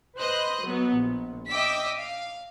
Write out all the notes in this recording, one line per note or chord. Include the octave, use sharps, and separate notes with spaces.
B4 C5 D#5 F#6
F#3 B3
A#1
D#5 E5 G5 D6 E6 B6
F5